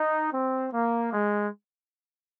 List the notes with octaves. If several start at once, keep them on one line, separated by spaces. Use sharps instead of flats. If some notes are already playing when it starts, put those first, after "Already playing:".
Already playing: D#4
C4
A#3
G#3